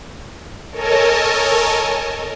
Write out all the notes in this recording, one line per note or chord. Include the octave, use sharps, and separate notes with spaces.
A4 A#4 C#5 D#5 G#5 A5